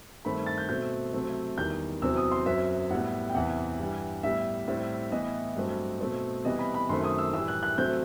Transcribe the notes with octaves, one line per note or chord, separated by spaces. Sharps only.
G2 D#3 A3 C4 B5
A6
G6
B2 A3 C4 G6
C3 F#3 A3 C4
E2 D#3 G3 G6
E2 C3 F#3 C4 E6
D#6
C6
F#2 F#3 C4 E5
A2 G3 B3 F#5
G5
E2 C3 E3 F#5
G2 E3 G3
A2 G3 B3 E5
A2 G3 C4
A2 E3 B3 D#5
G2 F#3 A3 C4
B2 A3 C4
C3 E3 G3 B3 D#5
B5
B5
F#2 D#3 A3 C4 C6
D#6
E6
A2 E3 G3 E6
F#6
F#6
C3 F#3 A3 C4 G6